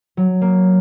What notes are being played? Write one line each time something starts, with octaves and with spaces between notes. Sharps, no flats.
F#3
A#3